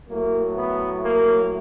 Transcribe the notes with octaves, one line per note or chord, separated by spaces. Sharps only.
A2 F#3 A3 A#3
B3
A#3